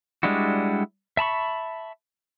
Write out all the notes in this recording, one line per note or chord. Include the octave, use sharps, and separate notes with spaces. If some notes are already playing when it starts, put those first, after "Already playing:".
G3 G#3 D4 E4 F#4
E5 A5 B5 C#6